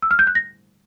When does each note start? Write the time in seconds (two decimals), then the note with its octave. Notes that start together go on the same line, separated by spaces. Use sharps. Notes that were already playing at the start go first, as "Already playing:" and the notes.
0.02 E6
0.11 F6
0.19 G6
0.27 F#6
0.35 A#6